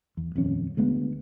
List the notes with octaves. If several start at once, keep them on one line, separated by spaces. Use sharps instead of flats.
E2
D#1 F2 C#4
D2 G#3 B3